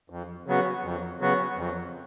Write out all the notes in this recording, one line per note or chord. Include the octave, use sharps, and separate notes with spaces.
F2
C#3 F#3 B3 F#4
F2
C#3 F#3 B3 F#4
F2